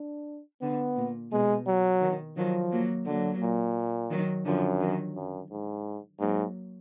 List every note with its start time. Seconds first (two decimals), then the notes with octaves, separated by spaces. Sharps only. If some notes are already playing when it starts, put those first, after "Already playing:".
Already playing: D4
0.62 D3 B3
0.97 A#2
1.32 B2 G#3
1.67 F#3
2.01 D#3
2.37 D#3 F3 F#3
2.72 F#3 A#3
3.06 D3 F#3 A#3
3.42 A#2
4.10 D#3 F#3
4.45 F#2 D3 F3
4.80 D#3 F#3
5.16 F#2
5.51 G#2
6.20 G#2 F#3 A#3